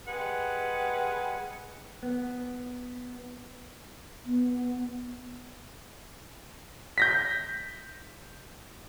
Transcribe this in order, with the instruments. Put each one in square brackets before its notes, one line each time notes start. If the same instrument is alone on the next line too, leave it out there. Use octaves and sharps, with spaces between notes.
[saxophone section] G3 G#3 G#4 B4 F#5
[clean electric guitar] B3
[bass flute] B3
[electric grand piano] G6 A#6 B6